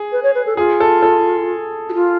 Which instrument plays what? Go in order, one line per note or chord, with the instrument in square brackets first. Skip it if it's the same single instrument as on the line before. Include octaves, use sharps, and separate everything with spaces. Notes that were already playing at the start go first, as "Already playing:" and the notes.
Already playing: [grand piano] G#4
[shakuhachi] B4
C#5
B4
A4
[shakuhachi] F4 [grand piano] G#4
[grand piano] A4
A4
[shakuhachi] F#4
F4